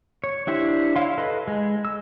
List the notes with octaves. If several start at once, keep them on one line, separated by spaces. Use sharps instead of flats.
C#5
D4 E4 G4 C5
E4 C#5 F5 C6
A4 B4 D#5 B5 C6
G#3
E6